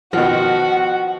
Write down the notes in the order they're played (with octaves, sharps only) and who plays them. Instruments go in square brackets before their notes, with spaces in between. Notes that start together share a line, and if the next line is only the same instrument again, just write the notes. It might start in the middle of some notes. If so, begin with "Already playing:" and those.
[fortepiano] B2 D#3 F3 [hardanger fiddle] F#4 [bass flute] F#5